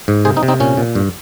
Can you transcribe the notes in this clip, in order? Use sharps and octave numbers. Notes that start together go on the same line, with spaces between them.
G#2
C3 G#4 C5
C4 D#4
C3
C4 D#4
A#2 C#4
A#2
G2